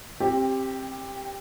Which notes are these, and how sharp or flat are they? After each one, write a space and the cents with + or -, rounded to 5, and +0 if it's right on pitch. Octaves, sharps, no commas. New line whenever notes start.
C4 +20 G4 +0